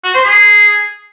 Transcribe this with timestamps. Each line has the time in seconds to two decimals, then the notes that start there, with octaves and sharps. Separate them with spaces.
0.04 F#4
0.14 C5
0.24 G#4